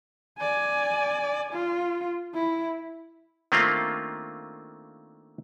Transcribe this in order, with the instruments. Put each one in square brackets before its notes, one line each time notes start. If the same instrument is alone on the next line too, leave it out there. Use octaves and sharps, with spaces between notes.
[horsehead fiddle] D5 G#5
F4
E4
[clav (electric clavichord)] D#3 A3 A#3 C4 D4 F4